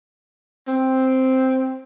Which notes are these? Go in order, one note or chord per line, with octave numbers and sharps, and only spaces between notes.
C4